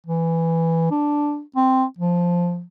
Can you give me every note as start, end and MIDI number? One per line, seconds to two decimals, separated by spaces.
0.07 0.90 52
0.91 1.41 62
1.56 1.84 60
1.98 2.63 53